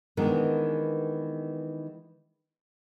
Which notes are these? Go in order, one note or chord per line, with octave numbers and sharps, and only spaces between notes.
D#3 E3 G#3 B3 D4 A#4